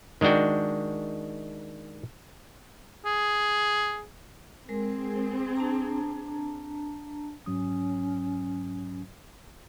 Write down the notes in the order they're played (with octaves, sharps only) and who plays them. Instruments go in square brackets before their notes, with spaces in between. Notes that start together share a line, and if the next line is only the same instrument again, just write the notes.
[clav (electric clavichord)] D#3 G#3 D4 F#4 G5
[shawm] G#4
[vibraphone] G#3 A#4 [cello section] C4 G#4
[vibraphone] D4 A5 A#5
[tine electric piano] G#2 F#3 D#6 [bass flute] C#4